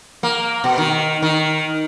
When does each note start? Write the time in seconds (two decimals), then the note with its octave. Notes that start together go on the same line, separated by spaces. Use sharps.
0.23 A#3
0.64 B2
0.78 D#3
1.22 D#3